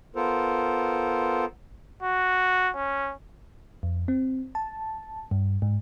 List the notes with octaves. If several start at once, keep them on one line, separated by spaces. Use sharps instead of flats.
B3 F4 A4 A#4 C5
F#4
C#4
F2
C4
A5
G2
G#2